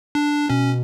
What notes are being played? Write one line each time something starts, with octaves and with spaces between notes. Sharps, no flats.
D4
B2 C#4